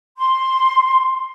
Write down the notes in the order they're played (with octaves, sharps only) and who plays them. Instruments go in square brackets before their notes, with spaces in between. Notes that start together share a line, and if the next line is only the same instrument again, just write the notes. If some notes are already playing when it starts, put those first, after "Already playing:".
[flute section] C6